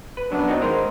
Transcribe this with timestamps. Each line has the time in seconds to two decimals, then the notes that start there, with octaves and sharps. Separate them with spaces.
0.17 B4
0.32 F#2 F#3 B3 D4
0.47 F#3 C4 D#4
0.62 D#3 G#3 A#4 C5